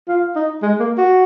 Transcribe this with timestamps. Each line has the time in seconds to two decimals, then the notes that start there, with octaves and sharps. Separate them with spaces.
0.08 F4
0.36 D#4
0.62 G#3
0.80 A#3
0.98 F#4